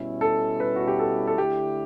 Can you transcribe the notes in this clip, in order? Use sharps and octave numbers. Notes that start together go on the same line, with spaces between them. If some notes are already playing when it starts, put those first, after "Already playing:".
Already playing: B2 G3 C#4 E4
A4
B4
F#4
G4
A4
A4
D3 A3 E4 G4